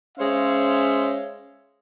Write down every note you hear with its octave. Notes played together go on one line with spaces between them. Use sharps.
G#3 C#4 C5 C#5 E5 F5